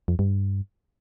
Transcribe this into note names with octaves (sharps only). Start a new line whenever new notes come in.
F2
G2